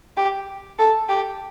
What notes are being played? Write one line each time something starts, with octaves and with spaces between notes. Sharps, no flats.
G4
A4
G4